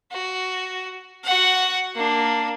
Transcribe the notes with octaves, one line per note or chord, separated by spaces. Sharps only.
F#4
F#4 F#5
A#3 D4